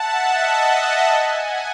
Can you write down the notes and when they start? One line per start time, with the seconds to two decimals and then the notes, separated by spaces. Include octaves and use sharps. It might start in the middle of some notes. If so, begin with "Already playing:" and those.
Already playing: E5 F#5 A5
0.19 D#5
0.62 E5
1.05 G#5
1.33 F#5